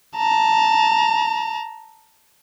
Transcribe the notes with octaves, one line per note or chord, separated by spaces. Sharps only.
A5 A#5